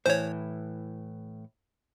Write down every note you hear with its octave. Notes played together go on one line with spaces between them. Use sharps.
A2 E3 C5 C#5